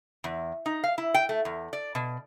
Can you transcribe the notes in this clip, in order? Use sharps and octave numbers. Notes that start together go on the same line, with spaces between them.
E2
D#4
F5
E4
G5
A3
E2
D5
B2